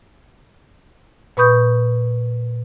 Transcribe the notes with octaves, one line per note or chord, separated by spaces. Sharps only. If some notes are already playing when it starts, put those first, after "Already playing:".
A#2 B4 B5 C#6 D#6 G6